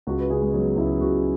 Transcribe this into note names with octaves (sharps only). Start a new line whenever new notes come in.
C#2 F#4
B4
C#3 G#4
G#3
F#3 B3
C#2 E4
C#2 F#4